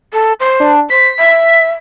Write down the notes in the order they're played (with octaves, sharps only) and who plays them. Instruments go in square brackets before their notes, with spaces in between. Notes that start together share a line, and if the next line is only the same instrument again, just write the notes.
[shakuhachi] A4
C5
[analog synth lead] D4
[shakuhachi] C5 [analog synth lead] B6
[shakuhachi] E5